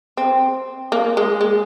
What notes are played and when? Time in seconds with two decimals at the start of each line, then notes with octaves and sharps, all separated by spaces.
0.17 C4
0.92 A#3
1.17 G#3
1.41 G#3